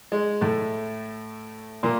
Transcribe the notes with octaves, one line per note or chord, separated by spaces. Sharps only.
G#3
A2 A3
A#2 A#3